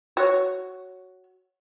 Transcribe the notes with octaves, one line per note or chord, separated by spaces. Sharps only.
F#4 C#5